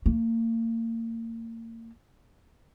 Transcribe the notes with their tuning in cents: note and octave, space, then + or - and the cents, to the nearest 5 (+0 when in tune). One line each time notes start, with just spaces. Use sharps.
A#3 -35